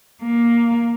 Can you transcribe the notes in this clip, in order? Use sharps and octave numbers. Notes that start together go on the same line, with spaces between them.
A#3